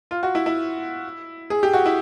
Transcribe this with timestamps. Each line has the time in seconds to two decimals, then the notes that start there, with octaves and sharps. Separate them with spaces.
0.11 F4
0.23 F#4
0.35 E4
0.46 E4
1.50 G#4
1.63 G4
1.74 F#4
1.85 E4